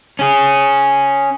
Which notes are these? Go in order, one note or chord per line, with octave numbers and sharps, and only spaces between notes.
C#4 G#4